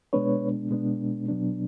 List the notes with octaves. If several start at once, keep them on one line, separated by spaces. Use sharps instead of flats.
B2 G#3 B3 D4 B4 C#5
B2 G#3 B3 D4
B2 F#3 B3 D4